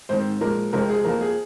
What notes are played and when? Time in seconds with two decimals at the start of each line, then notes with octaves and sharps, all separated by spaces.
0.09 G#2 D#3 C4 C5
0.41 A#2 F3 G#3 A#4
0.73 F2 C3 G#3 C4 A#4
0.89 G#4
1.04 F2 F3 A#3 A#4
1.21 G#4